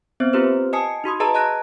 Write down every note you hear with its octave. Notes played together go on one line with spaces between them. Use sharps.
B3 C4 C5
C4 F4 G4 B4 C5
D#5 G#5 A5 D#6 C7 C#7
D#4 F#4 C6 D#6
G#4 B4 D#5 A5 A#5 E6
D#5 A5 A#5 F#6 A#6 D7